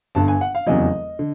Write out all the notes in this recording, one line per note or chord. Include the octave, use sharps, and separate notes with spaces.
G1 G2 D3 A5
G#5
F#5
F5
F1 E2 C#3 F#3 D#5
D3